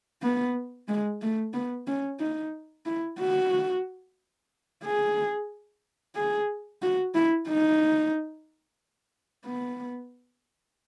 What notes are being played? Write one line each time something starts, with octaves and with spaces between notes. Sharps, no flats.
B3
G#3
A3
B3
C#4
D#4
E4
F#4
G#4
G#4
F#4
E4
D#4
B3